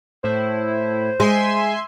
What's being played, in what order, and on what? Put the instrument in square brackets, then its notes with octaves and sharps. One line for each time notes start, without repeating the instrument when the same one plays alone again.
[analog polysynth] A2 E4 [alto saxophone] C5
[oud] G#3 [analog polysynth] E5 G#5 C6